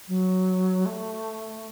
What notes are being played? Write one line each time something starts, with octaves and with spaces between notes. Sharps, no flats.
F#3
A3